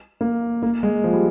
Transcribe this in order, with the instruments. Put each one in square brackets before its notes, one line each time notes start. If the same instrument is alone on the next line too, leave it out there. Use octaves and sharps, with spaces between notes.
[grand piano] A#3
A#3
G#3
F3
G3